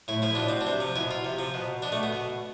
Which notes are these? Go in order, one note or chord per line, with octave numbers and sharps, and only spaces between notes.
A2 E4
F3 E4
B2 D4
C4
D4
C3
F3
B2 E4
F4
C3
F3
B2
B2 D4
A3
B3
B2